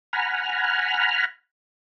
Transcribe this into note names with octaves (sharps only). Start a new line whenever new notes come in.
F#5 G#5 A#5 B5 F6